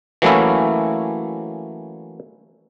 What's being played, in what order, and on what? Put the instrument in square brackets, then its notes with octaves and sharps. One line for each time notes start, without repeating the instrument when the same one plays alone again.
[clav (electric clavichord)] E3 F#3 A3 A#3 C#4 E4